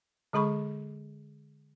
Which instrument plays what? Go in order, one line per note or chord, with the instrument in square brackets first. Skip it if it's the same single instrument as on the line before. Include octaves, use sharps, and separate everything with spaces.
[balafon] D3 G#3 G#4 B5 C#6